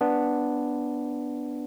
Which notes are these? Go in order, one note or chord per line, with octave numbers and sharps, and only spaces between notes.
B3 D4